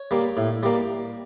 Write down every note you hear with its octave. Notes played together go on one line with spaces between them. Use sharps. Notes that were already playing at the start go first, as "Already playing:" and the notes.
Already playing: C#5
G3 A#3
A2
G3 A#3